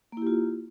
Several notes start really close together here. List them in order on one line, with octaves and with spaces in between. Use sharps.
A#3 E4 G4 F4